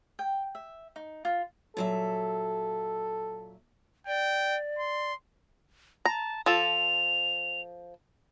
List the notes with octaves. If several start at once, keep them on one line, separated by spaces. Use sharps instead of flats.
G5
E5
D#4
F4
A#2 F#3 A4 E5
D5 G5
C6
A5 A#5
F3 A4 F7